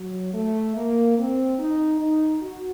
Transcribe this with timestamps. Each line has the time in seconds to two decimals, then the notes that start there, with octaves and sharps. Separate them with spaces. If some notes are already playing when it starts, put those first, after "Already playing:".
Already playing: F#3
0.34 A3
0.76 A#3
1.18 C4
1.59 D#4
2.01 D#4
2.42 F#4